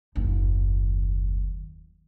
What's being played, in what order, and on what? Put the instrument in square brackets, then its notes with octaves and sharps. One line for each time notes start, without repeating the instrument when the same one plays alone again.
[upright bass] F#1 D#2